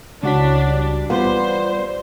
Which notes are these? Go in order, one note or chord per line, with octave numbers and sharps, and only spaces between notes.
C#2 D4 E4 F#4 C#5 B6
G3
E3 G3 B3 F4 B4 C5